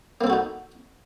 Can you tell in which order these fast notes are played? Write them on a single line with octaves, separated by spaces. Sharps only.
A#3 C4 A4 F#4 D#4